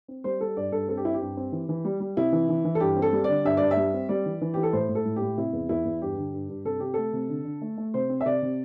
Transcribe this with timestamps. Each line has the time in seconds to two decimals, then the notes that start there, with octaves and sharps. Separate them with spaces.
0.08 C4
0.24 G3 C5
0.41 G3 A4
0.56 G2 D5
0.72 G2 A4
0.88 C4 A4
0.97 G4
1.05 C4 E4
1.14 G4
1.21 G2
1.37 C4
1.52 E3
1.69 E3
1.85 G3
2.00 G3
2.17 C3 E4
2.33 E3
2.49 E3
2.65 E3
2.75 A4
2.80 G2 G4
2.97 C4
3.02 A4
3.13 G3
3.24 D5
3.29 D3
3.45 G2 E5
3.57 G2 D5
3.71 E5
3.77 G3
3.94 C4
4.09 G3 D5
4.26 E3
4.41 E3
4.54 E3 G4
4.63 A4
4.73 A2 C5
4.89 A2
4.95 A4
5.05 A2
5.16 G4
5.22 A2
5.37 C3 E4
5.53 E2
5.69 E2 E4
5.85 E2
6.02 G2 G4
6.18 D3
6.34 G2
6.49 G2
6.65 C3 A4
6.80 C3 G4
6.94 A3 A4
7.13 C3
7.29 D3
7.45 D3
7.62 A3
7.78 A3
7.94 C3 C5
8.09 C4
8.21 E5
8.26 C3 D5
8.42 C3